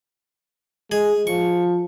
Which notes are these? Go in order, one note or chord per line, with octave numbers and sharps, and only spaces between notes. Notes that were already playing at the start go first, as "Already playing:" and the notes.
G#3 G#4
F3 C#6